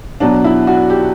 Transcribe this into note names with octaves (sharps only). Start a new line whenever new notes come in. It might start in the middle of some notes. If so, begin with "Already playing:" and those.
B2 F#3 D4
E4
F#4
G4